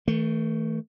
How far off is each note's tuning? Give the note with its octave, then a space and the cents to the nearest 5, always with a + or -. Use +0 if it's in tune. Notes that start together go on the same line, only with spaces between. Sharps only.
E3 -40 A3 +10